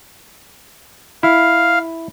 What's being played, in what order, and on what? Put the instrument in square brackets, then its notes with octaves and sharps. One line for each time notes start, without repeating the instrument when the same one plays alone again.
[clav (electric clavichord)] E4 [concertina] F5